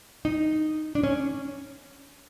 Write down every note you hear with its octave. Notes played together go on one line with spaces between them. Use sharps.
D#4
D4
C#4